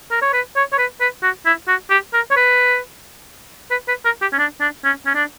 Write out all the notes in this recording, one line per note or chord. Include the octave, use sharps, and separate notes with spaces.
A#4
C#5
B4
C#5
C#5
B4
B4
F#4
E4
F#4
G4
A#4
C#5
B4
B4
B4
A#4
G4
C#4
D4
D4
C#4
C#4
D4